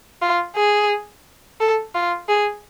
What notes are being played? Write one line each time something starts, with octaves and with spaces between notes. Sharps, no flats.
F4
G#4
A4
F4
G#4